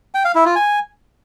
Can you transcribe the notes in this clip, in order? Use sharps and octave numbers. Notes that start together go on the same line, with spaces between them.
G5
F5
E4
F4
G#5